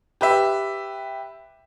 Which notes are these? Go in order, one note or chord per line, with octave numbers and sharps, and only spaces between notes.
G4 B4 E5